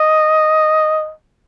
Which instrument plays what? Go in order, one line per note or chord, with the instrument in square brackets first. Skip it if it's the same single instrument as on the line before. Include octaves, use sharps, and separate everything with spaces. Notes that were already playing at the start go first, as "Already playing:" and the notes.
Already playing: [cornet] D#5